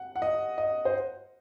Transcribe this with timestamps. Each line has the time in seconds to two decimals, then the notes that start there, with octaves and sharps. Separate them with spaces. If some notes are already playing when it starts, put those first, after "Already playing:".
Already playing: F#5
0.16 F#5
0.22 D#5
0.58 D#5
0.85 C5